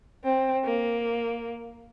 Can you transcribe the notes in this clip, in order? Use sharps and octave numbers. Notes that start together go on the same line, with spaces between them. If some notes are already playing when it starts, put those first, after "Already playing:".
C4
A#3